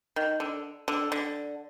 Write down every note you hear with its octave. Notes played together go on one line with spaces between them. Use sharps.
D#3
D3
D3
D3